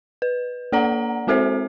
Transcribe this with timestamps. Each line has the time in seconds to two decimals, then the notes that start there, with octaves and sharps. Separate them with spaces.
0.22 B4
0.72 A#3 A4 D5 F#5 A#5
1.27 G#3 C4 F#4 A4 C5 E5